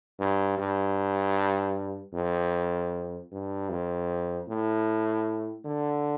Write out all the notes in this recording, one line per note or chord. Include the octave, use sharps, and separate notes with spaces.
G2
G2
F2
G2
F2
A2
D3